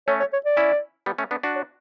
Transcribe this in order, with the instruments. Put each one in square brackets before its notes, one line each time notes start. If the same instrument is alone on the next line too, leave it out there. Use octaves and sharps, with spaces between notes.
[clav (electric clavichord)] A3 C#4 [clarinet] C#5
[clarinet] C#5
C#5
D5
[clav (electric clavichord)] C#4 E4
G3 B3
A3 C#4
B3 D4
D4 F#4
[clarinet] C#5